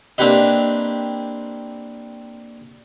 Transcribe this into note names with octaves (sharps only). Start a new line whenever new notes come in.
A#3 C4 D4 G4 B4 D#5